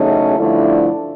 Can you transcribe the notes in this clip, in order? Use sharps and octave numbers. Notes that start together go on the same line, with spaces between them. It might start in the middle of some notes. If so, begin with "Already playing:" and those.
Already playing: E2 C#3 F#3 A3 C#4 D#4
G2 D3 F3 A3 D4 E4